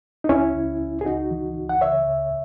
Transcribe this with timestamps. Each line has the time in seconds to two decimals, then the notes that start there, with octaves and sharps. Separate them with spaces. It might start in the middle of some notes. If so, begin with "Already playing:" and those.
0.24 D#4
0.29 C#2 C#4 E4
0.54 C#2
0.80 C#2
1.01 G#4
1.05 C#2 D#4 F#4
1.31 E3
1.57 C#2
1.69 F#5
1.81 C#3 C#5 E5
2.07 C#2